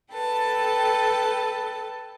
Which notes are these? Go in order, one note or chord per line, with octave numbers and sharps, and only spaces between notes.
A4 B4 G5 A5